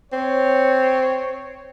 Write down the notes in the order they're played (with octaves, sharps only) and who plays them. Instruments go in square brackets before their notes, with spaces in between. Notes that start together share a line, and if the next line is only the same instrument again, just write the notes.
[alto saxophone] C4 [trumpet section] C#5